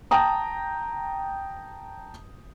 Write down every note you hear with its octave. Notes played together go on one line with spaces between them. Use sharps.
G5 A5 A#5 D#6